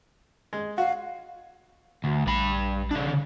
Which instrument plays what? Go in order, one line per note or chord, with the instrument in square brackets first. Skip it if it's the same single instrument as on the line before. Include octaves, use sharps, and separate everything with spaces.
[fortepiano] G#3
[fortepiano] F#4 [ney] F5
[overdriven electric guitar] D2
[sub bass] A#1 [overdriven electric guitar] G2 B5
[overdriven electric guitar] C#3 D4
[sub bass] D3